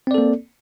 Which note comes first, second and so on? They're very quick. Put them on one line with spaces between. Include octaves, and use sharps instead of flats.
C4 D5 A4 A#3